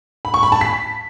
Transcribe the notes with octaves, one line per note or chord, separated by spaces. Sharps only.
B5
C#6
B5
A5
B6